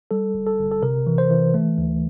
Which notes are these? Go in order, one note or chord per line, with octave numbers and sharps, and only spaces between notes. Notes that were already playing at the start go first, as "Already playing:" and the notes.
G3 A4
G1
A4
G1
A4
C3 A#4
E3
C5
E3
A3
D2